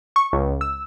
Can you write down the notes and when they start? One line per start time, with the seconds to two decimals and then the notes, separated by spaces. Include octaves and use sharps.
0.16 C#6
0.33 C#2
0.61 E6